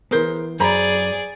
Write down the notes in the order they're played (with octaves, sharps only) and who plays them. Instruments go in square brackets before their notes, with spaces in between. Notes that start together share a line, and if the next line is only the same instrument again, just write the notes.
[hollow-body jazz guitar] E3 B3 [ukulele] G#4 A#4 C5
[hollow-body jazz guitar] F#2 [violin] G#4 D5 [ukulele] C5 A#5 B5